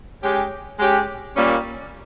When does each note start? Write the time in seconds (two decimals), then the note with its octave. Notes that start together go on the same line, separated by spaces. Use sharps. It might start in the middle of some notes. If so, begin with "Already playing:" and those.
0.22 G#3 C#4 G4
0.79 G#3 C#4 G4
1.36 A#2 G3 A#3 C#4